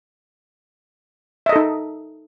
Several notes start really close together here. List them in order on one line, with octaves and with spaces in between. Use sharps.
E5 D#5 A4 D#4